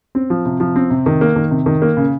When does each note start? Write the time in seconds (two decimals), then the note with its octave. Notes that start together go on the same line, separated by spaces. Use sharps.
0.15 C4
0.30 F3
0.45 C3
0.60 F3
0.76 C4
0.90 C3
1.06 D#3
1.21 A#3
1.36 D#3
1.51 C3
1.66 D#3
1.82 A#3
1.97 C#3